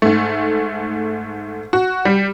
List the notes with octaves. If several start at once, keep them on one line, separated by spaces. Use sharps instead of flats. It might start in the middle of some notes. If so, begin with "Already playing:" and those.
G#2 A3
F#4
G3